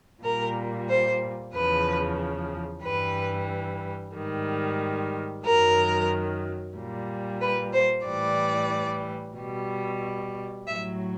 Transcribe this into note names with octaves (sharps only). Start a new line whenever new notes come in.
A#2 G3 A#4
C5
E2 C#3 F3 B4
G2 E3 G3 B4
G#2 D#3 G3
F#2 D#3 F#3 A#4
A#2 G3
B4
C5
A2 E3 G3 D5
B2 G3
A2 F#3 E5